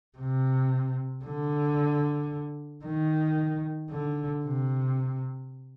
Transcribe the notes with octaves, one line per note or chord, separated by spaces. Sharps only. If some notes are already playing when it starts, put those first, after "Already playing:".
C3
D3
D#3
D3
C3